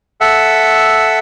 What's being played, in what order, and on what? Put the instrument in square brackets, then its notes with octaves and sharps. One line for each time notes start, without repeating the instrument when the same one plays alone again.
[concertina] A4 E5 F#5